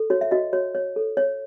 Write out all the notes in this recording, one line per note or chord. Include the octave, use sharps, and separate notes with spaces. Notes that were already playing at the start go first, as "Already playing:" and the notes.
Already playing: A4
F#4 C#5
E5
F#4 D#5
F#4 C#5
C#5
A4
C#5